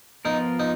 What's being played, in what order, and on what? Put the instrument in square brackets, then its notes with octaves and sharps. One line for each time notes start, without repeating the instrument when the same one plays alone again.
[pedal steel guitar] F3 B3 F4 A#4 [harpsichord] D#4
[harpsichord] D#4